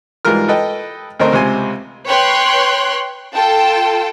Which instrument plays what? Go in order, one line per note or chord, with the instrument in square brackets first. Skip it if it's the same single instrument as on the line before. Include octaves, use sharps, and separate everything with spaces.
[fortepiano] G#2 E3 G3 F4 A#4 F6
A4 B4 D#5 G5
D2 A3 C4 D#4 A#4 C5
C#2 C3 C5 G#5
[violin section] B4 C#5 G5 C6 F#6
F4 A4 G5 A5